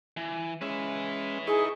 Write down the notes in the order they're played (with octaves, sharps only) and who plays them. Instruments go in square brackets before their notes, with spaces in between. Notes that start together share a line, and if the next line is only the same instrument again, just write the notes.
[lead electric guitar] E3
[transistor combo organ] G#3 C#4 [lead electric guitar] B4 E5
[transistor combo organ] D#4 E4 C#6 [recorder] G#4